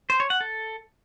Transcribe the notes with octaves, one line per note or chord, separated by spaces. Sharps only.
C5
C#5
F#5
A4